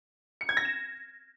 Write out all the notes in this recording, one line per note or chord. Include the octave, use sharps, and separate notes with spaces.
C#7
G#6
A#6
E7